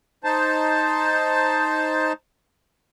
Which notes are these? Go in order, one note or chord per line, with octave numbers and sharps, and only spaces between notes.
D#4 C5 A5